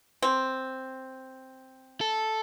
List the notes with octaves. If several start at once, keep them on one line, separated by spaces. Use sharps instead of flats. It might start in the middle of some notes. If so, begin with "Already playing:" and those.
C4
A4